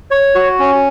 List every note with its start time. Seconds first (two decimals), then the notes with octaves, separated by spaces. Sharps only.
0.11 C#5
0.35 F#4
0.59 C#4